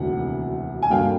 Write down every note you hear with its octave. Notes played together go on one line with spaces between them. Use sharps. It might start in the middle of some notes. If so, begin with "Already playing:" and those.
Already playing: E1 D2 C3 D#3 F#3 F#5
G#5
G2 D3 F#3 A#3 D4 F5 G5